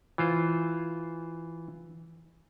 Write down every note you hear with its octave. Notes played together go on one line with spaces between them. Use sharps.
E3 F4 C5